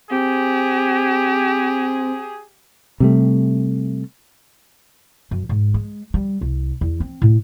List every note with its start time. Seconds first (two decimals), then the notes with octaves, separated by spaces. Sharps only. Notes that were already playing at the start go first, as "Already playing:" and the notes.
0.11 C4 G4 G#4
3.00 C3 G3 A3
5.31 F#2
5.49 G#2
5.74 G#3
6.14 G3
6.41 C2
6.81 E2
7.00 C4
7.22 A2